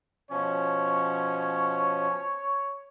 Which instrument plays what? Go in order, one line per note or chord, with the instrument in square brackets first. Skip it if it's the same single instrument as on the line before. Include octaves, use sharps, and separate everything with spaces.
[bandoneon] B2 F3 C#4 [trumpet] C#5